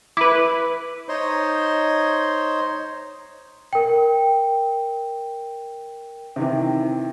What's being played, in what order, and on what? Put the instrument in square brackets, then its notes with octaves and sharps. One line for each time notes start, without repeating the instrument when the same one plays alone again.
[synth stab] E4 B4 [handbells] D6
[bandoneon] D#4 C5 C#5 D#5 C6
[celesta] A#4 G5
[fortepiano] C3 D#3 E3